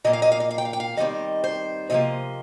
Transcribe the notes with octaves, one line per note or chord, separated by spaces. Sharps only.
A#2 F3 A#3 D#5
F5
D#5
F5
D#5
F5
G5
F5
G5
F5
D#2 D#3 G3 C4 D#5
C5
C3 F3 A#3 D#5